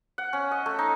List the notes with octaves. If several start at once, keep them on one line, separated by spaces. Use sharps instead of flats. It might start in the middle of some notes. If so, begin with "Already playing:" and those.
F#5
C#4
D#5
A3
D#4